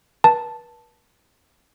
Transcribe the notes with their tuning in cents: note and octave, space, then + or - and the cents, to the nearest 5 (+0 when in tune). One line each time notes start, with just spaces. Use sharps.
B4 -40 A5 +0